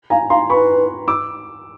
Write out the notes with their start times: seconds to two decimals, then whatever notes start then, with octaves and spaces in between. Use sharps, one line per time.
0.10 F5 G#5 A#5
0.30 F5 A#5 C6
0.49 B4 B5 C#6
1.08 D6 E6